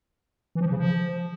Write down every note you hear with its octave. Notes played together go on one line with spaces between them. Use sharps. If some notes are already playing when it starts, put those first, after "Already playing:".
E3
F3
E3
C#3
F3